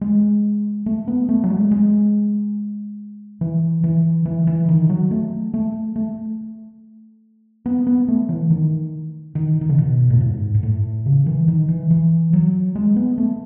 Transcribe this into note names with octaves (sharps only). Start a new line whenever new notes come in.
G#3
A3
B3
A3
F#3
G#3
G#3
E3
E3
E3
E3
D#3
F#3
A3
A3
A3
B3
B3
A3
E3
D#3
D#3
D#3
C#3
B2
A2
G#2
G#2
A2
C#3
E3
D#3
E3
E3
F#3
G#3
B3
A3